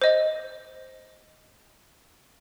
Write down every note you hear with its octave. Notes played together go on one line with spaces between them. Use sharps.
C5 D#5